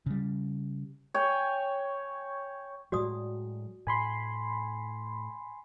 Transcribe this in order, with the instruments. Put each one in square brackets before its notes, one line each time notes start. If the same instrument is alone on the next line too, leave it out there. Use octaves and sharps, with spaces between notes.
[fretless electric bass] C#3 G3
[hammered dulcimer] C#5 G5 G#5
[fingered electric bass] A2 F#3 G#3 [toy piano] F#4 D5 D#6
[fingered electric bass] A2 [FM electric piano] G#5 B5 C6